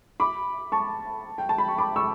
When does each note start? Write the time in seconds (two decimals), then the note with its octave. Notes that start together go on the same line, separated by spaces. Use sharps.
0.20 B5 D6
0.72 A5 C#6
1.38 G5
1.49 A5
1.58 B5
1.68 C#6
1.78 B5 D6
1.96 C#6 E6